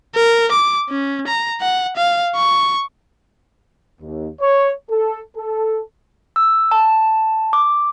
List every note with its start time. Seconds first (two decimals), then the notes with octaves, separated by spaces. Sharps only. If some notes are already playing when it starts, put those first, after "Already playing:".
0.15 A#4
0.52 D6
0.90 C#4
1.28 A#5
1.62 F#5
1.97 F5
2.36 C#6
4.01 D#2
4.41 C#5
4.91 A4
5.37 A4
6.36 E6
6.71 A5
7.53 D6